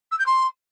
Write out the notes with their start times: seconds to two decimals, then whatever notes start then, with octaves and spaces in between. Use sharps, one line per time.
0.12 E6
0.19 G6
0.26 C6